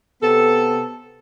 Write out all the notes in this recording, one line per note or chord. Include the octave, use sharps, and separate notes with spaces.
C3 B3 A4